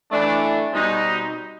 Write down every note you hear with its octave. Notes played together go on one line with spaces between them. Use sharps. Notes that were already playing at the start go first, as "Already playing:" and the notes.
E3 A3 D4
B2 G3 C4 D#4